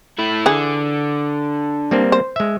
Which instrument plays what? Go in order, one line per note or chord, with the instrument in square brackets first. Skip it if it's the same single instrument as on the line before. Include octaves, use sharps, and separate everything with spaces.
[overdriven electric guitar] A3 E4
[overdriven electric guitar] D3 [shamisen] E3 G#4
[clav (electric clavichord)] G3 A#3 C4
[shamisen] C5
[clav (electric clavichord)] G#3 E5